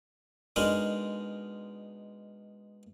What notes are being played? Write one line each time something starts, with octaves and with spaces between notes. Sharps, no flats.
B2 G#3 D4 D#4 A#4 B5